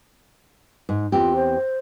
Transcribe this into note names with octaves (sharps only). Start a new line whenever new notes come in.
G#2
E2 C4 F4 G4
C5